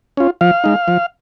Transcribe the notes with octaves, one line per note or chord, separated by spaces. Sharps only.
C#4 F4
F3 F5
G#3 D#4
F3